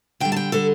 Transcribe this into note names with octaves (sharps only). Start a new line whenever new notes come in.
D3 G3 G5
A5
G5
D3 G3 A4